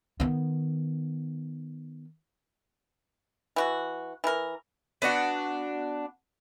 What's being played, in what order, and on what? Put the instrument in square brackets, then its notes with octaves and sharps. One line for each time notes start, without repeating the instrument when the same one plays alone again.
[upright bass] D#3 B3
[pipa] E3 F#4
E3 A#4
[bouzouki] B3 D4 F#4 F#5